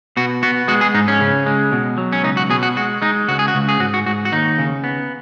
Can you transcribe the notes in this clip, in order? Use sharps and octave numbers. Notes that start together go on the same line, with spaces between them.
B2 F#4
B3 F#4
G#3 F#4
G#4
G#2 D#4
C#4
C#3
G#3
B2
F#3
C#4
C#2 D#4
F#4
B2 G#4
F#4
G#3 F#4
G#3 D#4
C#2 F#4
G#4
F#4
C#2
G#4
G#2 F#4
F#4
G#2 F#4
F#4
D#2 D#4
C#3
B3